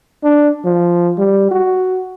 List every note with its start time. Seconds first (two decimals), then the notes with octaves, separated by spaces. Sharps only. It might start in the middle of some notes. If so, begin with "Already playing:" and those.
0.23 D4
0.65 F3
1.18 G3
1.51 F#4